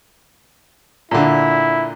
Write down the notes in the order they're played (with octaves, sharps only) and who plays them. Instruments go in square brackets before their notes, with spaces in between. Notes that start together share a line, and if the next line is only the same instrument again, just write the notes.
[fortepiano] A#2 D3 [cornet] E4